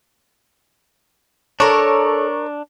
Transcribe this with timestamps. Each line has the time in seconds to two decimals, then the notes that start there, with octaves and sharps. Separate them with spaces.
1.60 D4 A4 A#4 C#5